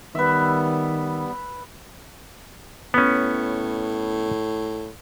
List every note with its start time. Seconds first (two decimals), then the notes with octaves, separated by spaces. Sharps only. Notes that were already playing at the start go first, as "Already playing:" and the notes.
0.15 D#3 G3 B3 B4 E5
2.94 A2 B3 C#4